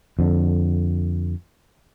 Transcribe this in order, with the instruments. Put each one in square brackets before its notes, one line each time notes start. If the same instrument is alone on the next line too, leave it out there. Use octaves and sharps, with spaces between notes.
[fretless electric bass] F2 D3